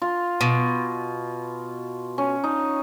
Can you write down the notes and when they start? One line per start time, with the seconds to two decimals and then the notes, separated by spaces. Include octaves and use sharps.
0.02 F4
0.41 B2
2.18 C#4
2.44 D#4